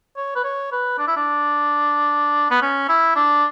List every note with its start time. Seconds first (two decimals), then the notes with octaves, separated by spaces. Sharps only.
0.17 C#5
0.35 B4
0.44 C#5
0.72 B4
0.99 D4
1.07 E4
1.16 D4
2.51 B3
2.62 C#4
2.89 E4
3.16 D4